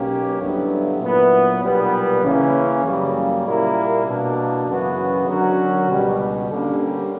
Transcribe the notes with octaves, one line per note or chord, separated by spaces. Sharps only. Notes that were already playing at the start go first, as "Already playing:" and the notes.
Already playing: B1 B2 A#3 C#4 G4
G2 D3 F#3 B3 E4
A#2 F#3 B3 E4 B4
B1 A#2 G3 B3
C#3 E3 A#3 C#4
F#2 C#3 G3 A#3
A#2 G3 A#3 E4 A#4
B2 A#3 D4
F#2 C#3 E3 B3 F#4
D3 F#3 C#4 F#4 A#4
C#2 B2 G3
G2 D3 G3 A#3 C#4